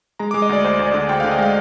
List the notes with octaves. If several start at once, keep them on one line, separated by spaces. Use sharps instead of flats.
G#3 A#5
D6
G#3
D#5
D2 D5
D2 C5
D2
D5
D3
D2 G5
F5
D3
D#5
G#3 F5